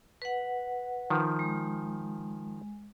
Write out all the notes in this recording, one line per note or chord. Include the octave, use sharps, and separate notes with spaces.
B4 F#5
D#3 F3
G#3